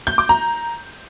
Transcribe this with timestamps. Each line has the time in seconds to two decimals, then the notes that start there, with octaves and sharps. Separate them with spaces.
0.07 G6
0.18 D6
0.29 A#5